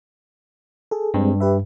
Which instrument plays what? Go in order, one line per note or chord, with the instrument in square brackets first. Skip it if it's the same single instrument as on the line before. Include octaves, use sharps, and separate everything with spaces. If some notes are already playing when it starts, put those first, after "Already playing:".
[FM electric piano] G#4 A4
[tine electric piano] G2 [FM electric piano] G3 G#3 C4
[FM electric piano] G4 B4 E5